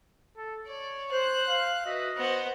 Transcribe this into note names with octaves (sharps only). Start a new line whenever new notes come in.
A4
C#5 D5
C5 F#6
F5
F#4 B4 D#5 E5
B3 F#4 C5